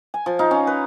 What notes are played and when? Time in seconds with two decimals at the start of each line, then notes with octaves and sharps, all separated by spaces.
0.14 G#5
0.26 F3
0.39 D#4 F4 F5
0.51 C#4
0.67 B4